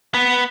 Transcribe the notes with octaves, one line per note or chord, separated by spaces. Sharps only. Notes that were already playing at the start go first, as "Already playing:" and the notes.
B3